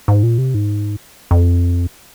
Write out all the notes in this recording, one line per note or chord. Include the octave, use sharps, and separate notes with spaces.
G#2
A#2
C3
G#2
F2